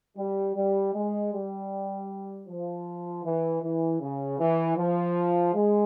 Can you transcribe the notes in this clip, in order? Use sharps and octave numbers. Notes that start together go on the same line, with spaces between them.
G3
G3
G#3
G3
F3
E3
E3
C#3
E3
F3
G#3